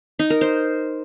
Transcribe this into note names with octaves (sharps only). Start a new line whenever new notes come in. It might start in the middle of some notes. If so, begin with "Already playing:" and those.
D#4
A#4
C5